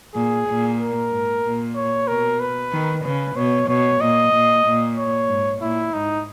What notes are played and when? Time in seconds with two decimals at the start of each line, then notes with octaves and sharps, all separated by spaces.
0.14 A#2 G#4
0.47 A#2
0.79 A#4
1.11 G#2
1.44 A#2
1.76 C#5
2.08 B2 A#4
2.40 B4
2.72 D#3
3.04 C#3 B4
3.36 B2 C#5
3.68 B2 C#5
4.01 A#2 D#5
4.33 A#2
4.65 A#2
4.97 C#5
5.29 G#2
5.61 A#2 E4
5.93 G#2 D#4